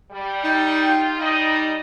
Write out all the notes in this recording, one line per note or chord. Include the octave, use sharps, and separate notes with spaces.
G3
D#4 G5
F4 G4
G3 D#4 D#5